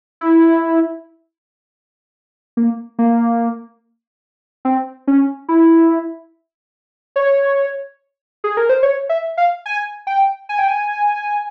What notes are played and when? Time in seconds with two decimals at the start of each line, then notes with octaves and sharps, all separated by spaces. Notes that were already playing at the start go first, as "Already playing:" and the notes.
0.21 E4
2.57 A#3
2.99 A#3
4.65 C4
5.07 C#4
5.48 E4
7.16 C#5
8.44 G#4
8.57 A#4
8.69 C5
8.83 C#5
9.09 E5
9.37 F5
9.66 G#5
10.07 G5
10.49 G#5
10.59 G5
10.68 G#5